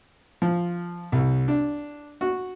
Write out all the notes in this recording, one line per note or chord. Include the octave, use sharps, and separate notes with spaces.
F3
C2
D4
F#4